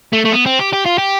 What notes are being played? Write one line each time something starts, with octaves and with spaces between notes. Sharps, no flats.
A3
A3
B3
C4
G4
G4
F4
G4